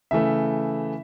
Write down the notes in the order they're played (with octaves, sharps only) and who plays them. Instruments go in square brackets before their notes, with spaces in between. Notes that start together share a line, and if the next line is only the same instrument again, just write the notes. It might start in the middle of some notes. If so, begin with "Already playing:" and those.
[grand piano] C#3 E3 A3 E5